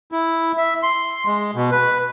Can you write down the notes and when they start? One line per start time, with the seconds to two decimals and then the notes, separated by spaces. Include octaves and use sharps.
0.12 E4
0.57 E5
0.83 C6
1.26 G#3
1.55 B2
1.72 B4